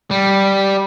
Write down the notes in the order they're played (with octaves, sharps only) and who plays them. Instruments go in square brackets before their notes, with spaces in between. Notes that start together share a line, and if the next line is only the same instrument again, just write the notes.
[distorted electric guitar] G3